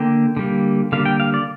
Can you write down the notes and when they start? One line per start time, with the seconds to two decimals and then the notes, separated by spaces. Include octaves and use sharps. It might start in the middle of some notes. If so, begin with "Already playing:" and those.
Already playing: D3 A#3 G5
0.37 D3 G3 A#3
0.92 D3 G3 A#3 F5
1.06 G5
1.20 F5
1.34 D5